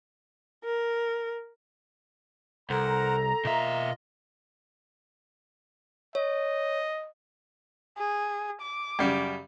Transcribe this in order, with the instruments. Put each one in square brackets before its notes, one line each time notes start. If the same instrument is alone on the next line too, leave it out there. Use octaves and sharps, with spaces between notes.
[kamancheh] A#4
[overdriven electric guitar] C2 [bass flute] A4 [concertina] A#4 C5 F#5 [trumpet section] A#5
[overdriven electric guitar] B2 E5 [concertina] A#3 F4 D#5
[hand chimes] C#5 [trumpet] D#5
[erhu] G#4
D6
[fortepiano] F#2 C#3 G3